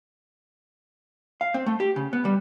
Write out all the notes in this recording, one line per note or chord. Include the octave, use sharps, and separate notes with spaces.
F5
C4
A3
G4
C#3
B3
G3